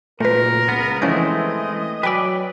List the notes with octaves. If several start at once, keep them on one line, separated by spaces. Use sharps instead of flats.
F#1 A#2 A3 A#4 B4
C#2 B3
E3 F3 G#3 A3 C4 C#4 D#5 G6
F#3 B4 D5 G5 G#5 E6